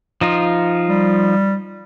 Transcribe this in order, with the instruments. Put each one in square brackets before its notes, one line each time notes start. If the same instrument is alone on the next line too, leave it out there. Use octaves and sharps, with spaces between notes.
[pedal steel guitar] F3 D#4 F4
[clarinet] G3